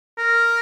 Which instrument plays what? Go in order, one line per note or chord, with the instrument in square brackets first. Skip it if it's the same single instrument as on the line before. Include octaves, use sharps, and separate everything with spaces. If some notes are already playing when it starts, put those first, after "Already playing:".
[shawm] A#4